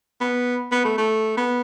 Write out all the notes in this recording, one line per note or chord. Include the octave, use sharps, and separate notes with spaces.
B3
B3
A3
A3
B3